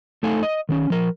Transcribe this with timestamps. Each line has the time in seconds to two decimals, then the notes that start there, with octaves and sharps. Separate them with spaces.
0.23 A3 D#4 A4 F5 G#5
0.43 D#5
0.69 D#3 B3 C#4
0.90 F3 A#4